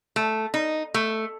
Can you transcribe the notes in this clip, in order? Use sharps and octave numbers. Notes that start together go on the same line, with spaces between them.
A3
D#4
A3